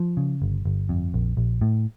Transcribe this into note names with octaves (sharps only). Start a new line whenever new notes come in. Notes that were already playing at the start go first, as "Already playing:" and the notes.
Already playing: F3
C#3
G1
G1
F2
A#1
A#1
A2